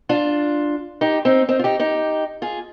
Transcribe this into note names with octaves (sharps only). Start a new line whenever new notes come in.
D4 F4
D#4 G4
C4 D#4
C4 D#4
F4
D#4 G4
D#4 G4
F4 G#4